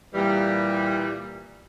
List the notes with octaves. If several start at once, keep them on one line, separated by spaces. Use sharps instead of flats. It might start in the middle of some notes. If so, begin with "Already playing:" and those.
A#2 E3 G3